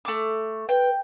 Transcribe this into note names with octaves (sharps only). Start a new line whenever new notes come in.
A3 D6
B4 G5